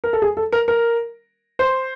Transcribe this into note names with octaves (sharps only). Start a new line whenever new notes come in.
A#4
A4
G#4
A4
A#4
A#4
C5